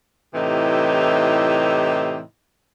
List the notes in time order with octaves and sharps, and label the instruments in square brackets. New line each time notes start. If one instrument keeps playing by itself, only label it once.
[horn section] A2 C3 E3 D#4 E4 G4